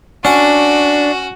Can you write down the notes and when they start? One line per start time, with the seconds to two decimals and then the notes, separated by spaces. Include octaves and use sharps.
0.25 C#4 D4 F#4 F#5